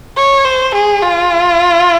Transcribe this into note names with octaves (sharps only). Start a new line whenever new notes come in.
C#5
C5
G#4
F4